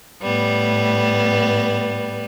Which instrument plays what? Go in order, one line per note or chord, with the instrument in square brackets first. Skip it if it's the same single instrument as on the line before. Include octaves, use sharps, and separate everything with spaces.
[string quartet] A2 G3 B3